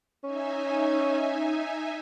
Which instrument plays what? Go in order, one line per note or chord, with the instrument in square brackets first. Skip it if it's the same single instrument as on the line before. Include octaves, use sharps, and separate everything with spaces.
[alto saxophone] C#4 [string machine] D#4 E5 G#5